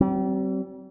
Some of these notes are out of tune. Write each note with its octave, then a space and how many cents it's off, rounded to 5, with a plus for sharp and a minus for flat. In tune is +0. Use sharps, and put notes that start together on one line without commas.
G3 -40 C4 +0